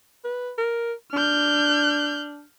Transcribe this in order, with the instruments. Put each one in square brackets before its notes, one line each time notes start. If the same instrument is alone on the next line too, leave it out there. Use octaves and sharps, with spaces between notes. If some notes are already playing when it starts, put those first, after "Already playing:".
[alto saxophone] B4
A#4
[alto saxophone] D4 [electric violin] F6 G6